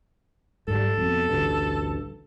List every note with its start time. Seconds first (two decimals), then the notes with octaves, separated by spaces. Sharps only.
0.68 G#2 G3 A4
0.98 F2 B2
1.29 A1 D2 G2